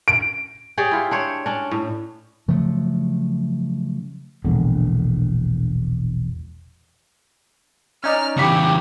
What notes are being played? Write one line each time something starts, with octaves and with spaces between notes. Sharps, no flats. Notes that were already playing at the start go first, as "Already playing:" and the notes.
D7
G4 G#4 C#5 D5
E4 F4
D4 C5 C#5
C#4 D4
A2
C#3 F3 F#3 A3
E1 A#1 D3
C#4 D#4 D5 F6
C#3 E3 G4 B5 C#7